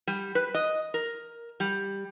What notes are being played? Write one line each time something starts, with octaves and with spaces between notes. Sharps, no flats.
G3
B4
D#5
A#4
G3